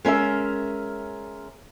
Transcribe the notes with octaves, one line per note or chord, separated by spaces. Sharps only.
G#3 C#4 A#4 E5